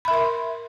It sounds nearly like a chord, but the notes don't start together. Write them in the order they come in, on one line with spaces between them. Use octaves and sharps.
B5 E5 A#4 C6